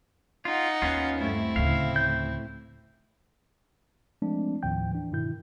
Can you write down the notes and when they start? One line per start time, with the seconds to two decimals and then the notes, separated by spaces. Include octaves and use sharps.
0.45 D#4 F4 F#5
0.82 D#2 B3 C#4 F4
1.19 G2 A3 C4 E4
1.56 D2 A2 C#3 F5
1.96 G6
4.22 F3 G#3 A3 C4 D4
4.63 D#2 A2 D#3 F3 G5 G6
4.92 E3 D4
5.12 G2 B2 D#3 E4 G6